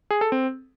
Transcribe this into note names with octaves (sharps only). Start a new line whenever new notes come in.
G#4
A4
C4